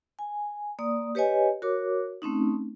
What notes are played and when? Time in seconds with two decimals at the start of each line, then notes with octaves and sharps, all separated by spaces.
0.19 G#5
0.79 A#3 D5 D#6
1.15 G4 B4 C#5 D#5 G#5
1.62 F#4 A#4 C#5 D6
2.22 A3 C4 C#4 D#4